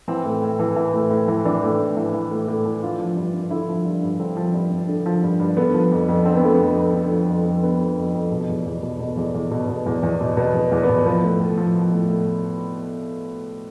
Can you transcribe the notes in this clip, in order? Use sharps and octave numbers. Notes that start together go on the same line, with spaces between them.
E3 C4
A2
A2
E3
E3
A2
A2
E3
E3 D4
A2
A2
E3
E3
A2
A2
E3
D3 F4
F3
G2
G2
D3 E4
F3
G2
G2
D3 C4
F3
G2
G2
D3
F3
G2
G2
D3 B3
F3
F2
F2
D3 C4
B3
F3 A3
B3
F2
F2
D3
F3
F2
F2
D3 B3
F3
F2
F2
B2
E2
E2
B2
B2
E2
E2
B2
B2
E2
E2
B2
B2 B3
E2
E2
B3
B2
F3 B3
A2
A2
F3
F3
A2
A2